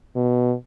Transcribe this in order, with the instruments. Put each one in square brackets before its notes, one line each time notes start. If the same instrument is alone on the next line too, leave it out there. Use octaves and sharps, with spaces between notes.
[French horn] B2